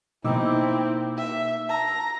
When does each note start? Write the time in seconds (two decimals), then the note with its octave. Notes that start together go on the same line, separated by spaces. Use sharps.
0.24 B2 A#3 C4 D#4 E4 D6 E6
1.17 E5
1.69 A5 A#5 E6